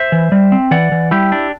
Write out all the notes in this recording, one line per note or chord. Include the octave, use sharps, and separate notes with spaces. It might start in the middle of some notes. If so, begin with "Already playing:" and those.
Already playing: C5 E5
E3
G3
C4
E3 D5 F#5
E3
G3 E4 G4
D4